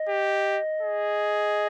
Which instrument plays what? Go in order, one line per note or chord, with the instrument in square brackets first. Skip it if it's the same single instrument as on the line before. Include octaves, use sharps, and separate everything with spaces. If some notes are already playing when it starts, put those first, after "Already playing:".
Already playing: [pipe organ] D#5
[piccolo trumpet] G4
G#4